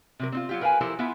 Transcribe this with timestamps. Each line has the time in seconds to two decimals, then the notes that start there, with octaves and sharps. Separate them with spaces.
0.19 C3 F#3 A#4
0.32 C4 D#4 F4
0.49 F#3 F4 G4
0.61 A#4 B4 F5 G5 G#5
0.81 F3 E4 G4 A4 A#4 C5
0.99 B3 E4 F4 E5